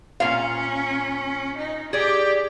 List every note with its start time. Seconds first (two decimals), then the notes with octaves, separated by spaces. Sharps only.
0.20 A#2 C#4 F5
1.58 D#4
1.93 G4 G#4 D5